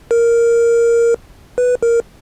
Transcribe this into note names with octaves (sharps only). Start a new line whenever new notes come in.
A#4
B4
A#4